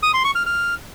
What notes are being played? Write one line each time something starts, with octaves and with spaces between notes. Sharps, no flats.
D#6
C6
C#6
F6
F6